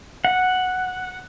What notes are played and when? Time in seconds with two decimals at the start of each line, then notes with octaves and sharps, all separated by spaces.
0.25 F#5